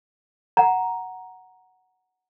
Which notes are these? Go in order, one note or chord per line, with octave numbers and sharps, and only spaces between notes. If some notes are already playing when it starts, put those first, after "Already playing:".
F#5 A#5